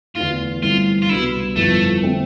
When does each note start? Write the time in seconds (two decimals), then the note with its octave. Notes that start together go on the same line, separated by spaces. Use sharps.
0.16 E2 D3 A3 E4 F4
0.63 G1 G2 E3 A3 C4 F4
1.02 F4
1.09 C2 B2 B3 D4 E4
1.56 G1 F2 E3 A3 B3
2.03 D3 A3 C4